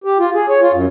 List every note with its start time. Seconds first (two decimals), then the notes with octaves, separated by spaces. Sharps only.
0.04 G4
0.19 F4
0.34 G#4
0.49 C#5
0.61 F4
0.73 F#2